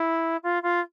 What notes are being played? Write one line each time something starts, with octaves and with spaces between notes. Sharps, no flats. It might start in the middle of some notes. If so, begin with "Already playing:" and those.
Already playing: E4
F4
F4